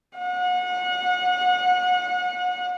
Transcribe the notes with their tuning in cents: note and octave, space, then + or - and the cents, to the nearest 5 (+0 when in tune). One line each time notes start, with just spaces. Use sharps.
F#5 -30